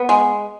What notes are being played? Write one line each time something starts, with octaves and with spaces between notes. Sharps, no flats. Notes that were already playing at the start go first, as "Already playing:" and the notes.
Already playing: B3
G#3